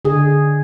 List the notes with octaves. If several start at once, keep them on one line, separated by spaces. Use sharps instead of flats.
D3 G#4